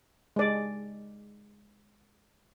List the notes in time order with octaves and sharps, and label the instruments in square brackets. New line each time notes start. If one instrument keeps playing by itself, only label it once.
[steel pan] G#3 D5